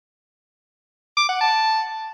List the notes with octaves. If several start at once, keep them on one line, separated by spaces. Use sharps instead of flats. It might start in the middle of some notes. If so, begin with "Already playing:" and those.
D6
F#5
A5